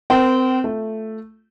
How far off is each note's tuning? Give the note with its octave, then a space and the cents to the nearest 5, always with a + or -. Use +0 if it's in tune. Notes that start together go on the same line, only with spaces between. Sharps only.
C4 -20 A#4 +5 G5 -35
A3 +0 F4 +0